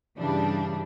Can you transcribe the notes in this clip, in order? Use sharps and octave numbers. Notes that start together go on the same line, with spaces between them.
G2 C#3 E3 G3 D4